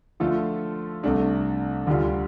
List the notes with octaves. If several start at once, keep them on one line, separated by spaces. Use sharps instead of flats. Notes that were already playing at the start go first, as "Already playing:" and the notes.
D3 F3 A3 F4 A4
C2 C3 A3 D4 A4
D2 D3 G3 D4 F4